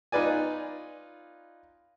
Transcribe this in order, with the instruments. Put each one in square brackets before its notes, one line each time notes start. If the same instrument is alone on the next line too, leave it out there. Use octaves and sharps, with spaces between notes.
[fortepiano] D#4 F4 B4 D5 G#5